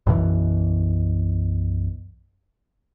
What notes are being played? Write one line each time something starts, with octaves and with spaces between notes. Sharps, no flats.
B1 F#2 B2 E3